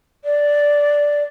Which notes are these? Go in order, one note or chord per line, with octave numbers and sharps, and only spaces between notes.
D5